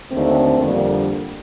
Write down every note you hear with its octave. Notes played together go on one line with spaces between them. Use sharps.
D#2 D3 A3 C4
F2 D3 G3 A#3